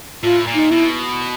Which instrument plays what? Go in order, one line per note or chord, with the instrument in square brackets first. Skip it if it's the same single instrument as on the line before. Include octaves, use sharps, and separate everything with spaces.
[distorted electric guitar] A2 [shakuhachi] F4
[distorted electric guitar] A#2
[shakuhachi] D#4
[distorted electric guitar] B2 [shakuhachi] E4